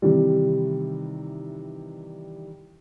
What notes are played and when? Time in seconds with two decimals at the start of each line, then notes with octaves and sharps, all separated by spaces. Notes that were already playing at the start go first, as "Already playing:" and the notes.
0.02 C3 D#3 E3 G3